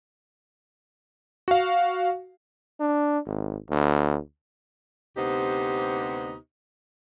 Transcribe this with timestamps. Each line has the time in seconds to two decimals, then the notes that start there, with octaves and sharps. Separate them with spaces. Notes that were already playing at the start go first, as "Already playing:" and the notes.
1.48 F#4 F5
2.80 D4
3.26 G#1
3.69 D2
5.17 D2 C3 B3 D#4 G4 C5